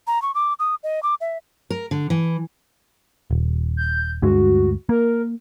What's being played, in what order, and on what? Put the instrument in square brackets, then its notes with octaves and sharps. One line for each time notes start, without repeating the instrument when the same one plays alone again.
[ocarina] A#5
C#6
D6
D#6
D#5
D6
E5
[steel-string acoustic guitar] A#4
D3
E3
[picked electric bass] D#1
[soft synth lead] G6
[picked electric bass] D2 G2 G#3 [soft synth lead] F#4
[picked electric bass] A#3 [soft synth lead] A#4